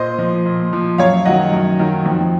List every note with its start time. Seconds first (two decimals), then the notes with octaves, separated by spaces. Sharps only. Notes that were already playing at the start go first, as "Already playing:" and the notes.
Already playing: A#2 C5 D#5
0.19 F3
0.45 A#2
0.73 F3
0.98 F#2 C#5 F5
1.25 D#3 F#3 D#5 F#5
1.52 F#2
1.79 D#3 F#3
2.06 F2